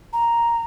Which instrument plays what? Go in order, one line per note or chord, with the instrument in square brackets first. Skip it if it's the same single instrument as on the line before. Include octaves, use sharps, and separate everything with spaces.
[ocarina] A#5